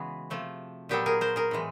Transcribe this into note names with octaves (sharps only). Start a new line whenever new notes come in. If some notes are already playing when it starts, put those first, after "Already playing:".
Already playing: C#3 E3 G#3 B3 F#4 G#4
C3 F3 A3
A#2 F#3 B3 G4 A4
G#4 A#4
A#4 C5
G#4 A#4
A2 E3 G#3